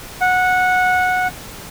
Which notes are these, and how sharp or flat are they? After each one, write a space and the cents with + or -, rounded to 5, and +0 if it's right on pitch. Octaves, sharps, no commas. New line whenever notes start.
F#5 -15